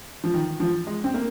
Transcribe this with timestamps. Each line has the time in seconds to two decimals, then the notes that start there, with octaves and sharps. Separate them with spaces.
0.24 F3
0.34 D#3
0.60 F3
0.87 G#3
1.04 C4
1.14 A#3